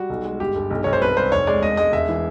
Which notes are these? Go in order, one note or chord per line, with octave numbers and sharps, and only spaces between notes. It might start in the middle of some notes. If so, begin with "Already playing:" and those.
Already playing: G3 F#4
B1
G#3
G1 G4
G1
B1
B1 C#5
C5
C2 B4
C2 C5
F1 C#5
G#3 D5
E1 D#5
G#3 D#5
E1 E5
E3